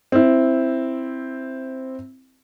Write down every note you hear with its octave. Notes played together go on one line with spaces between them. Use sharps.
C4 E4